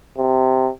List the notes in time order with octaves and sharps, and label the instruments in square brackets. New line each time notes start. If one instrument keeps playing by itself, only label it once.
[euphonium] C3